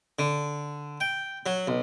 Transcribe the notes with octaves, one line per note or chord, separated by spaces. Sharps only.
D3
G5
F#3
B1